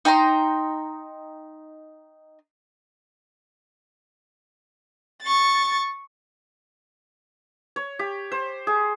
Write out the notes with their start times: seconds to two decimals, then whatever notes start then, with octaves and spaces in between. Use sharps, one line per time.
0.05 D#4 G5 A#5 C6
5.23 C#6 A6
7.76 C#5
7.99 G4
8.32 C5
8.67 G#4